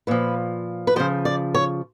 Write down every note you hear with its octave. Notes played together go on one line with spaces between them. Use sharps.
A#2 F3 B4
B4
C#3 F3 C5
D5
C#5